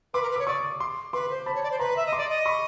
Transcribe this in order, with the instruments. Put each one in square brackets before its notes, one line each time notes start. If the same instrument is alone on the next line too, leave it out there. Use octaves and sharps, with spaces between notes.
[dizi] B4 [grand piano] C6 D6
[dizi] A#4
B4
[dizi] C#5 [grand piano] D6
[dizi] D5 [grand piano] C#6 D#6
[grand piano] C6 D6
[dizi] B4 [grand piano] C6 D6
[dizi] C5
[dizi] C5 [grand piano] A5 B5
[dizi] C#5
D5
C5
[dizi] B4 [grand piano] A#5 C6
[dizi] E5
D#5
[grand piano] C6 D6
[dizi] D5
D#5
[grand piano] B5 C#6